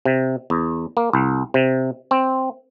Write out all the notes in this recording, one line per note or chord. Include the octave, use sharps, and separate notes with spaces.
C3
E2
A#3
C2
C3
C4